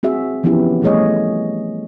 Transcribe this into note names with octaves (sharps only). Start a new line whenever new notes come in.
C4 F#4 G#4 E5
E3 F3 B3 C#4 E4 G4
F3 G3 A3 G#4 C#5 D#5